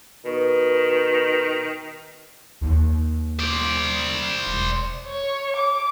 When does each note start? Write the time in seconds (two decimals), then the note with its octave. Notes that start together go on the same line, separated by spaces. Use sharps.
0.25 B2 D#3
2.61 D#2
3.40 C5 D5
4.46 E1
5.07 C#5
5.56 D6